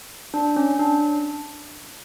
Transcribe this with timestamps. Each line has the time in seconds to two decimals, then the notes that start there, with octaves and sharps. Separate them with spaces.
0.34 D4
0.57 C#4
0.79 D4